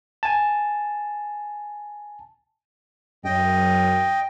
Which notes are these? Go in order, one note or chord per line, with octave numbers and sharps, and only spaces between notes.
G#5 A5
F#2 D#5 G5